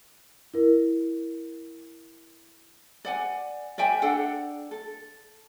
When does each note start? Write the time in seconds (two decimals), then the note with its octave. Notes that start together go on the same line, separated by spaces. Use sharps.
0.54 E4 A#4
3.05 D5 F#5 G#5
3.78 D5 E5 G5 G#5
4.02 D4 A4 F#5 G5
4.71 A4